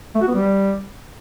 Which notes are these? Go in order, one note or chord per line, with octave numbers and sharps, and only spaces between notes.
A3
F#4
B3
G3